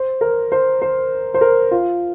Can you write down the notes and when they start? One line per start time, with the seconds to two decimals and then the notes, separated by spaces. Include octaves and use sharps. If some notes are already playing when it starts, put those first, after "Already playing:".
Already playing: C5
0.21 A#4
0.52 C5
0.82 C5
1.34 C5
1.41 A#4
1.71 F4